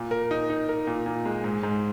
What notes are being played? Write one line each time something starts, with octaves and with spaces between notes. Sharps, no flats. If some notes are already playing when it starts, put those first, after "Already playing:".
Already playing: A#2
A#4
D#4
D#4
A#4
A#2
A#2
G#3
G#2
G#2